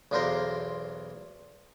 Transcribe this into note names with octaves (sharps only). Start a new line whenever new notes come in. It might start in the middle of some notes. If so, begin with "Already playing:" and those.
B1 E2 D4 F4 A#4 C5